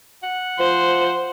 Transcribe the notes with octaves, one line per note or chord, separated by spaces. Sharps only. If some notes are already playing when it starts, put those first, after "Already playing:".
F#5
F3 C5